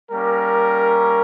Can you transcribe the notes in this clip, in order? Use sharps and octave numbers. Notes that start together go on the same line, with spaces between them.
G3 A#3 C#4 A#4